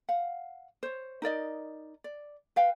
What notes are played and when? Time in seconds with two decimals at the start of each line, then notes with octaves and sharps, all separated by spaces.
0.09 F5 F#5
0.83 C5 C#5
1.22 D#4 A#4 D5 D#5
2.04 D5
2.56 B4 F5 G5